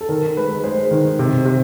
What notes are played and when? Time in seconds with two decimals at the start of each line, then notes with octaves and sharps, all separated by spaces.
0.01 A4
0.09 D#3 A#4
0.37 G#3 B4
0.64 G#3 C5
0.91 D#3
1.19 C3
1.45 C3